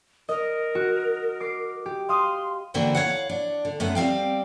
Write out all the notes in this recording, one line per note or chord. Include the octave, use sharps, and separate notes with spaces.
A#4 D#5
F#4
D6 C7
G4
F5 C6 D#6
D3 E3 A#3 C4 F#4
C#5 F5 F#5
D4
D3
F#2 A3 B3 F#5
G3 C4 F5 G5